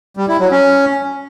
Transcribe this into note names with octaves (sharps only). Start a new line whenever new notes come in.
G3
E4
F#3
C#4